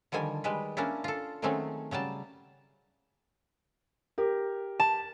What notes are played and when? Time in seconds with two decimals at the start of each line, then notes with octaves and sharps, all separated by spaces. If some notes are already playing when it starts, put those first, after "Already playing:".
0.12 D3 D#3 F3 G3 G#5
0.44 G3 G#3 B4
0.77 A#3 C#4 D4 E4
1.04 F4 A4
1.42 D#3 F#3 G#3 A3 C4 C#4
1.91 C#3 F#3 G3 A5
4.18 G4 A#4
4.80 A5